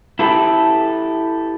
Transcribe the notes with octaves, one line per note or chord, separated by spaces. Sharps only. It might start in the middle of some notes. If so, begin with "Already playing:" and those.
E4 G4 A4 B4